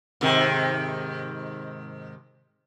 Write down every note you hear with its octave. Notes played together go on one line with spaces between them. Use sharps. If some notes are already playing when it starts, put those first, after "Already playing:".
G#2 C3 D#3